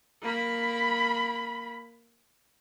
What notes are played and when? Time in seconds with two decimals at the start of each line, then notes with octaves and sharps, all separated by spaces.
0.22 A#3 B5